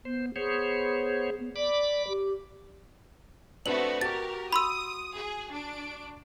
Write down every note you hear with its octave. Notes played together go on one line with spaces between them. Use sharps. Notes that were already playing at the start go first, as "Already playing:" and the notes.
B3 C5
B3 G#4 C5 C#5
B3
D5 B5 D6
G4
A3 B3 C4 D4 F#4 B4 F#7
F#4 G4 A#4 A6
B5 C6 D#6 E6
G#4
D4 D7